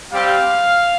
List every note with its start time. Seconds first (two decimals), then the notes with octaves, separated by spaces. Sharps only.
0.12 G3 C4 G4 F5